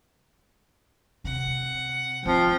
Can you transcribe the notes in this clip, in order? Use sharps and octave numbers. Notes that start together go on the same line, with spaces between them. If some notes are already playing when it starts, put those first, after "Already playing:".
C3 F#5
F3 C4 G5